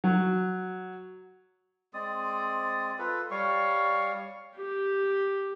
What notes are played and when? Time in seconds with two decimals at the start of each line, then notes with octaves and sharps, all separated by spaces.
0.04 F#3
1.94 G#3 C4 D5 D#6
2.98 F4 A4 B4
3.31 G3 C#5 F5 C#6
4.56 G4